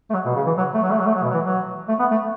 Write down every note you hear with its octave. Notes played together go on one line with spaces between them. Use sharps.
A3
F#3
B2
C#3
E3
F#3
A3
F#3
A3
F#3
A3
F#3
B2
F#3
E3
F#3
A3
B3
A3